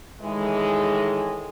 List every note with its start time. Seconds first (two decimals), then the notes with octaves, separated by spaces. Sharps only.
0.21 A2 D#3 E3 G#3